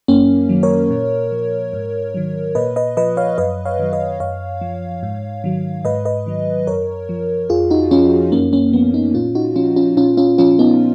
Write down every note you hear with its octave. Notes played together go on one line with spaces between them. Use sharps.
F#2 A#3 C#4
D#3 F#3
A#4 C#5
A#2
F3
G#2
D#3 F#3
A#2 B4 D#5
B4 D#5
F3 B4 D#5
C#5 F5
F#2 B4 D#5
C#5 F5
D#3 F#3
B4 D#5
F#2 C#5 F5
F3
G#2
D#3 F#3
G#2 B4 D#5
B4 D#5
D#3 F#3
F#2 A#4 C#5
F3
F2 F4 G#4
D#4 F#4
F3 C#4 F4
F#2 A#3 C#4
A#3 C#4
F3 B3
B3 D#4
A#2 C#4 F4
D#4 F#4
F3 C#4 F4
C#4 F4
A#2 C#4 F4
C#4 F4
F3 C#4 F4
B3 D#4